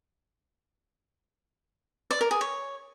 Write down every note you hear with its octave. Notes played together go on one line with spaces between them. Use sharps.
D5
A#4
G#4
C#5